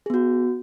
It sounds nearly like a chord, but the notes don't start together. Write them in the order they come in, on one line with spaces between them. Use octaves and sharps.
G#4 B3 F#4